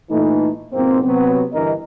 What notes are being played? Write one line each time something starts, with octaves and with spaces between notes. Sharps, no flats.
A#2 E3 A3 D#4
F2 G#2 B2 A#3 C4
C3 F#3 B3 C4
G2 D3 E3 A#4 D#5